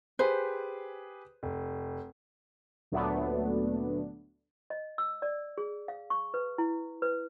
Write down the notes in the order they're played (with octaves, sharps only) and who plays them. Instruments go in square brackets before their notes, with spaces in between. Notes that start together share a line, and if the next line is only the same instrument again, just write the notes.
[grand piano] G4 G#4 B4 [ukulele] C5
[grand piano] F1
[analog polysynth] D2 A#2 F#3 A3 B3 D4
[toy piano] D#5
E6
D5
G#4
F5
C#6
B4
E4
B4